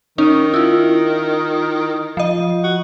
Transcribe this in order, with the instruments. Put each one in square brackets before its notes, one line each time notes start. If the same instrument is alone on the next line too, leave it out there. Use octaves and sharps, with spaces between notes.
[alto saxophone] D#3 [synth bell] C#4 D#4
[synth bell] E4 F4
F3 D#5
[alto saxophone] F#4